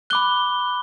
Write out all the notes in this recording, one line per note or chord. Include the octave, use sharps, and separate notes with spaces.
B5 D6 F#6 G7